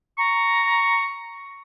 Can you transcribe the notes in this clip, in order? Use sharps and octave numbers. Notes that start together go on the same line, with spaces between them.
A#5 C#6